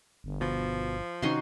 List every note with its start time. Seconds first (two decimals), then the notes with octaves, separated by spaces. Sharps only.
0.24 G1
0.41 B2 F3
1.22 C3 D#3 C#4 D#4 F#4 C6